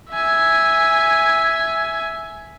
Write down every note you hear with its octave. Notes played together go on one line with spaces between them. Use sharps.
E5 G#5